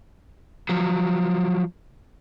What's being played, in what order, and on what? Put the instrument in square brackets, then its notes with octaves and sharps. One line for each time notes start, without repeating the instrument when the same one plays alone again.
[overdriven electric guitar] F3 F#3